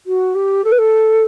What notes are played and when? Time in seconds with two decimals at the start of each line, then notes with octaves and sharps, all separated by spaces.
0.06 F#4
0.34 G4
0.64 A4
0.71 B4
0.78 A4